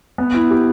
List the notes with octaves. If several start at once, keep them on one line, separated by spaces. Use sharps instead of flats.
B3
E4
G4